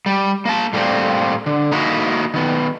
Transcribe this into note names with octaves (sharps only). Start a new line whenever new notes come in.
G3
A#3 A5
A2 G3 A#3 C4
D3
A#3 D#4 E4 F#4
D#3 B3